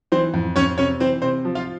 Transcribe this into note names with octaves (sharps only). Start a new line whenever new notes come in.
E3 C4 C5
F2
F2 C#4 C#5
C3 C#4 C#5
E3 C4 C5
C3 C4 C5
F3
F4 F5